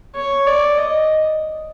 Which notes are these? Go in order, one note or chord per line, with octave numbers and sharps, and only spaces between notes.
C#5
D5
D#5